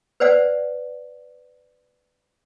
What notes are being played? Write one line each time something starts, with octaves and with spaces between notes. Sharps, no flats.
B4 C5 D5 F5 F#5